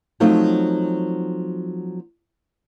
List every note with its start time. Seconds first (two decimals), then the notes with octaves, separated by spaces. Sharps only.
0.20 F3 F#3 A3 C4 D#4